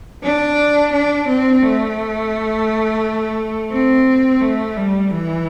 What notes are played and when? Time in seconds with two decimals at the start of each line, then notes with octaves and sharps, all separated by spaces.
0.23 D4
0.92 D4
1.28 C4
1.63 A3
3.71 C4
4.41 A3
4.77 G3
5.11 E3